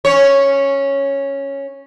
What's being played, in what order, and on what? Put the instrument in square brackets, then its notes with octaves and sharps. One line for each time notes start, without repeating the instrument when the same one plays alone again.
[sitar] C#4 C#5